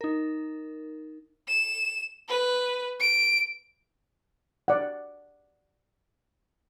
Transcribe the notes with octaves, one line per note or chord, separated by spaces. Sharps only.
D#4 A#4
E7
B4
D7
D5 F#5